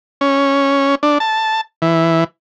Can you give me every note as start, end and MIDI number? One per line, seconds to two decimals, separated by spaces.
0.21 0.95 61
1.03 1.18 62
1.20 1.61 81
1.82 2.24 52